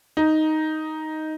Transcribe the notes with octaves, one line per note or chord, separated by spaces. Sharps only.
D#4